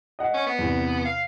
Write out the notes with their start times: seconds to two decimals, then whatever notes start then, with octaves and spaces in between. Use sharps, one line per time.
0.19 D#5 F#5
0.34 C#4
0.46 B3
0.59 E2 C3
1.05 F5